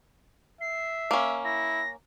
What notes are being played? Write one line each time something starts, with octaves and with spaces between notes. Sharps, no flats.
E5 C7
A#3 C#4
E4 A#6